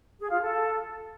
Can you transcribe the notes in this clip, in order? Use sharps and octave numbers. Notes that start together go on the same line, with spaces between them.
G#4
F4
A4